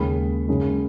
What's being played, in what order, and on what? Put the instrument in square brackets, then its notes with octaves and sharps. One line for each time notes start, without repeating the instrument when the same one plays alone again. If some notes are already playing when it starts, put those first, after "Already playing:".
Already playing: [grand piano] D#2 C#3 G#3 B5
F#2 C#3 G#3